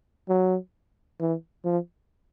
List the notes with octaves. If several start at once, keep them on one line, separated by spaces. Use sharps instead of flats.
F#3
E3
F3